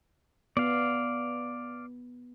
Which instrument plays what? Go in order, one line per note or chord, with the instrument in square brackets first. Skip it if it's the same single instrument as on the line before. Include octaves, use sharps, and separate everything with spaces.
[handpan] B3 [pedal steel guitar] D5 F5